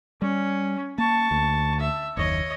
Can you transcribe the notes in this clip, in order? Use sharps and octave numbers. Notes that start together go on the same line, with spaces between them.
G3 C#4
A#3 A5 C#6
D2
E5
F#1 D#2 C#5 D#5